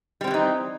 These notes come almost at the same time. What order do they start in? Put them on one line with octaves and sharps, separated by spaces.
G3 C4 F3 E3 D#4